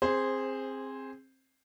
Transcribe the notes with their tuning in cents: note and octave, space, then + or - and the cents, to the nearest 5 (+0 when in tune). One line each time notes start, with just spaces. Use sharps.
C4 +20 G#4 -10 C5 +0